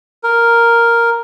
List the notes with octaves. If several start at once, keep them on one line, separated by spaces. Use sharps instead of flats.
A#4